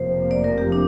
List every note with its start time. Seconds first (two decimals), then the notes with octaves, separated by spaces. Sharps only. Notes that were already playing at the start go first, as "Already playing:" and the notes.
Already playing: F1 F2 C3 F3 A#3 C5
0.31 D5
0.44 A#4
0.58 G4
0.72 D4